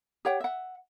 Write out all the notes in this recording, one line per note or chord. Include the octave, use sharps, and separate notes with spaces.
G4 C#5 F#5 G5
E5 F#5